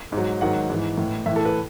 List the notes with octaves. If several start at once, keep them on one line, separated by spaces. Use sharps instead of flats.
G#2
F#3
G#2 D#3 F#3 F#5
G#2 E3
A2 E3
A2 E3 E5
A4
B4